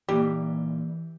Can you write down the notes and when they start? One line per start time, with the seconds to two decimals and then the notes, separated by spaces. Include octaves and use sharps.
0.09 A#2 E3 G3 A#3 D#4 G4